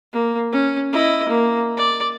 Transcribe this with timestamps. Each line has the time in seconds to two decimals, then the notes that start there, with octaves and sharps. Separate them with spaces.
0.13 A#3
0.52 C#4
0.93 E4 D#5
1.29 A#3
1.77 D5